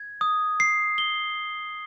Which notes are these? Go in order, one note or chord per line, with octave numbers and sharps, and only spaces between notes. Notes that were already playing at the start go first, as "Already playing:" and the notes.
Already playing: G#6
D#6
C7
G7